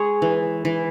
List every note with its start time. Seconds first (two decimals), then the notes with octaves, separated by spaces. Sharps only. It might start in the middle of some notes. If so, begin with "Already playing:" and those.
Already playing: G#3 G#4 C#5
0.22 E3
0.65 E3